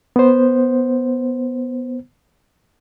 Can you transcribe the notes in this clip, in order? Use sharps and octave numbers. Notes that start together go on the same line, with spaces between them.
B3 C5